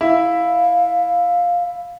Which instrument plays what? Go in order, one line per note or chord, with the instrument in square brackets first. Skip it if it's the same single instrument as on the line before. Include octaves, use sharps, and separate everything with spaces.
[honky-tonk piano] E4 [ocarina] F5